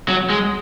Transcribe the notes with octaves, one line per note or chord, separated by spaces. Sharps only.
F#3
G#3